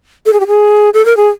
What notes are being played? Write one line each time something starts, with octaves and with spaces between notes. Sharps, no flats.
A4
G#4
G4
G#4
A4
A#4
G#4